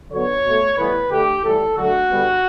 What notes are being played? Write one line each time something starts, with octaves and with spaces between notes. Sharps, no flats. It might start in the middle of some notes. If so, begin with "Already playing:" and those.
D3 F#3 B3 C#5
B2 A3
A2 E3 G3 B3 B4
D3 A3 G4
A2 E3 G3 A4
D3 F#3 A3 F#4
D3 G3 B3